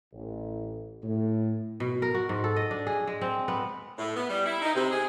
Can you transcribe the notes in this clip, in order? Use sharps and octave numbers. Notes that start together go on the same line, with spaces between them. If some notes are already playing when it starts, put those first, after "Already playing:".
A1
A2
B2
A#4
F#4
G#2
A4
D#5
D4
G#4
G#3
C4
B3
A2
B3
G3
E4
D#4
C3
G#4